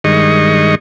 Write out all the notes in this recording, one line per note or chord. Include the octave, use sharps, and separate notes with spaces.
G2 D#3 G#3 D#5 C#6